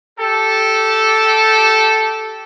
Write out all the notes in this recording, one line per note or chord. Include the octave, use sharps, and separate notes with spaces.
G4 A4